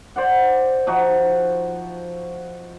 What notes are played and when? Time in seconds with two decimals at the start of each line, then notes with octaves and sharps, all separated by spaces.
0.16 C5 D5 F#5
0.87 F3 D#4 F#4